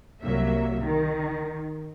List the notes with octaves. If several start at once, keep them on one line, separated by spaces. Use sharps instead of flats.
C2 F#3 A#3 E5
D#3